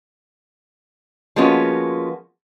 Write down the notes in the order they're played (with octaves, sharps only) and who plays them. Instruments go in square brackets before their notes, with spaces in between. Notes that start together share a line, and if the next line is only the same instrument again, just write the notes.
[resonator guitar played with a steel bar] F3 G#3 A#3 B3 C#4 F#4